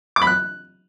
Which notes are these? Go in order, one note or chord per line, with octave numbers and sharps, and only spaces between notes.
D6
B5
F#6